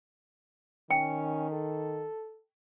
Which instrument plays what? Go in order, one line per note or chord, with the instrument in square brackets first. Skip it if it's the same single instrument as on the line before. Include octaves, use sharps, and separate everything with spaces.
[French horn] D#3 [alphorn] C#4 [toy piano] G5
[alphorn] A4